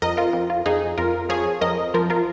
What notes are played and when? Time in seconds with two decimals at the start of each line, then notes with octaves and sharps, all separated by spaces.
0.02 F2 A#4 D#5
0.17 F4 A#4
0.33 F2
0.50 F4
0.66 F2 D#4 G#4
0.98 F2 F4 A#4
1.29 F3 G#4 C#5
1.61 F2 A#4 D#5
1.94 F3 F4 A#4
2.10 F4 A#4